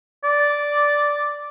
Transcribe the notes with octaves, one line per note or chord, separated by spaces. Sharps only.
D5